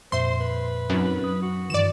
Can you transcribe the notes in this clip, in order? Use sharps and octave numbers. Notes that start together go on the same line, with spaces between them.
F2 A#2 C5 E5 C6
B4
F#2 C4 D#4
D#6
F#4
G2 D#3 E3 D5 E7